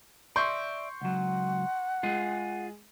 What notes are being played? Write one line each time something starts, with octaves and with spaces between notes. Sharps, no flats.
D5 E5 C6 C#6 G6
C#2 F#3 F#5
G#3 F4 G#4